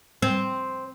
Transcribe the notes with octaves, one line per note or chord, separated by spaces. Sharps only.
C4